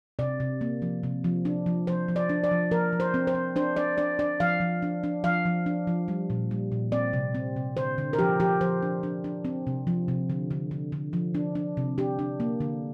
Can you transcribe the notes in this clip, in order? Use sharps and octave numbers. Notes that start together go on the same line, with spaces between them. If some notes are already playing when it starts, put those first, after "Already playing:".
C3 D5
C3
A#3
F3
C3
F3
D4
F3
F3 C5
F3
D5
D4
D5
F3
F3 A#4
F3
C5
C4
C5
C4
D4 C5
D4 D5
D4 D5
D4 D5
F3 F5
F3
D4
D4
F3 F5
F3
D4
F3
G3
A#2
G3
A#2
C4 D5
C3
C4
C3
D3 C5
D3
A#4
F3 G4
F3 G4
F3 C5
D4
D4
D4
C4
C3
F3
C3
D3
D3
D3
D3
F3
D4
D4
C3
D4 G4
D4
A#3
D3